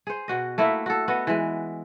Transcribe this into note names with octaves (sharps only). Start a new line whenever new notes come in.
G#4 C5
B2 F#4 D#5
A3 A#3 E4 F#4
F#4 A4
B3 F#4 D#5
E3 G#3